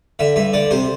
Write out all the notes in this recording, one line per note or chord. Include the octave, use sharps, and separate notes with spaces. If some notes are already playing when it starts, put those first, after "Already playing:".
D3 E5
G2 E5
D3 D5
C3 C5